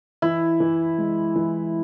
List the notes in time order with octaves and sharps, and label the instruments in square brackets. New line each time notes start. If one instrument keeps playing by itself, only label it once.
[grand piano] E3 [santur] E4
[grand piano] E3
G#3
E3